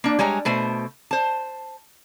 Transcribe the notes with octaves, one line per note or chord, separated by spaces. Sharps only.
A#3 D4
G3 G#3 C#5 G#5 A#5
B2 A3 C5
C5 A5